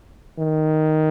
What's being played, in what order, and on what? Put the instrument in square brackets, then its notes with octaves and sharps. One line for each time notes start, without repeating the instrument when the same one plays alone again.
[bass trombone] D#3